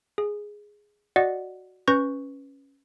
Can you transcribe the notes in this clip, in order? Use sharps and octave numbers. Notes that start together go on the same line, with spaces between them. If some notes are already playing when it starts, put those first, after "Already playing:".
G#4
F#4 D5 D#5 F#5
C#4 B4 C#6 G6 A#6